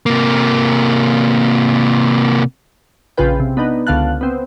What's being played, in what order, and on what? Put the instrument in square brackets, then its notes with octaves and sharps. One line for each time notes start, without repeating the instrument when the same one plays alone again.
[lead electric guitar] C3 A#3
[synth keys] A#1 C#3 F4 G#4 B4 G5
C3
B3 D4 D#4 B4
C#2 D3 B3 F5 A5 F#6
B3 C4